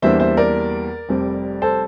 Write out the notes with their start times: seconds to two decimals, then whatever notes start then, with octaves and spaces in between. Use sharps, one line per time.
0.02 E2 E3 G3 A#3 D4 C5 E5
0.20 C5 E5
0.37 A#4 D5
1.09 F1 F2 C3 G3 C4
1.62 A4 C5